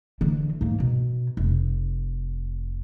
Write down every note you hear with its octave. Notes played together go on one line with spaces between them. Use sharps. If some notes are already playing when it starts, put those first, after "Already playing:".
D3 E3
G#2 A#3
B2
F1